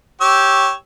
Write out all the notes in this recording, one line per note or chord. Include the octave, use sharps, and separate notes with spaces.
G4 C#5 E6